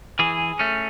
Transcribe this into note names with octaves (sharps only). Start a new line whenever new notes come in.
E3 G#4
A3 C#4